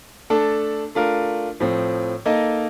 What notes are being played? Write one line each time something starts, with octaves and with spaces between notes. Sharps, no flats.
A3 D4 A4
A3 D4 F4 A#4
A2 F3 C4
A#3 D#4 A4 D#5